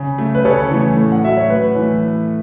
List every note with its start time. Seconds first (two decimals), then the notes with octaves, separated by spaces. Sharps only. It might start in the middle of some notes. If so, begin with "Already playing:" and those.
Already playing: C#3
0.18 A3
0.35 B4
0.45 C#3 A4 C#5
0.71 E3 A3
0.97 A2
1.12 F#5
1.23 F#3 A3 E5
1.37 C#5
1.49 A2 B4
1.76 E3 A3